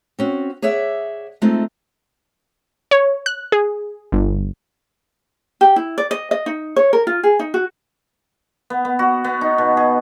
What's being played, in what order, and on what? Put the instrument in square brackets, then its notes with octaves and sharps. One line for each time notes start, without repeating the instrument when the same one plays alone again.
[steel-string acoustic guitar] C4 C#4 F#4
G#4 C#5 D5 E5 F#5
G#3 A3 C4 D#4 F4 A4
[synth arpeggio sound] C#5
F#6
G#4
G1
[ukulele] G4
E4
D5
D#5
D#5
D#4
C#5
A#4
F4
G#4
D#4
F#4
[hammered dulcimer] B3
B3
F#4
B3
D#4
B2
G#4